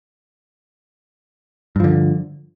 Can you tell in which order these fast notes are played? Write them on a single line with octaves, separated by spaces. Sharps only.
G2 F3 D3